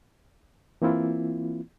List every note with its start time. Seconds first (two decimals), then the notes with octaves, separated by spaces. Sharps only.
0.82 E3 A#3 C4 E4 F4